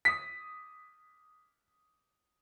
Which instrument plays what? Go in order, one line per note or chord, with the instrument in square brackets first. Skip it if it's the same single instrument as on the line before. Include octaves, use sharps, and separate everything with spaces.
[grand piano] D#6 B6